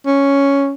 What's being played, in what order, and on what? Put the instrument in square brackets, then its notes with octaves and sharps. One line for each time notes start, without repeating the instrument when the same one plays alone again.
[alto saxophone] C#4